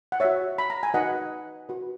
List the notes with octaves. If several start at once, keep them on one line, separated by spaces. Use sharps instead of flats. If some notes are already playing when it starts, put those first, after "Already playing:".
F#5
F#4 C#5 E5
B5
A#5
G#5
D#4 F#4 B4 D#5 F#5
F#4 B4